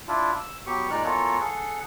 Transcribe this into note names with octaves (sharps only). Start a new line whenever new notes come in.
D4 E4 F4
E6
F#3 B3 G4 C#6
A#2 G#3 D#4 D5 F6 F#6
E3 B3 F4 A4 A#4 C#5
G#4 A4 F#5